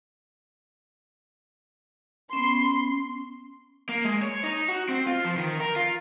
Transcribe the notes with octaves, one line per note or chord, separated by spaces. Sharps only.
B3 C#4 C6
A#3
G#3
C#5
D#4
F#4
C4
F4
F3
D#3
A#4
F4